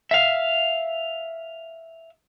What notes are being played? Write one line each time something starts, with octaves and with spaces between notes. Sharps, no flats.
E5 F5